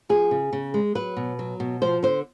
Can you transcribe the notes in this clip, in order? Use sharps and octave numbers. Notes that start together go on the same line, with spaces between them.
F3 G#4
C#3
C#3
G#3
F#3 B4
B2
F#3
B2
F3 C5
D3 C5